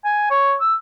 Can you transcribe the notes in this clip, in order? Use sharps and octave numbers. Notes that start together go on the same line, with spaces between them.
G#5
C#5
E6